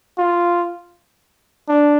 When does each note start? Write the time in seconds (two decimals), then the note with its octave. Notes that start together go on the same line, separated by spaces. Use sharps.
0.18 F4
1.69 D4